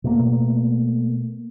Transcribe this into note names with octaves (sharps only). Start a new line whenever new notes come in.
B2 A3 A#3